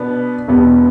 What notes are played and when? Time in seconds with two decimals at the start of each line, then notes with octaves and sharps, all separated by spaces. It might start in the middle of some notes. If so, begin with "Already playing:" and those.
Already playing: B2 B3 D4 B4
0.48 E1 E2 B2 B3 G4